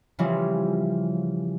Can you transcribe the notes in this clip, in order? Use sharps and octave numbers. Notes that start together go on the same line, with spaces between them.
C#3 E3 F3 G3 C4 C#4